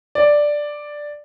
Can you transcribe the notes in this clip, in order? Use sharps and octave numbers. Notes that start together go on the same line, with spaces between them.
D5